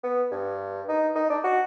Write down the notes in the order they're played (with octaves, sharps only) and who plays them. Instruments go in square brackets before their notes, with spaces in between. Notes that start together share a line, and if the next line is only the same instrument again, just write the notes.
[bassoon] B3
G2
D#4
D#4
D4
F#4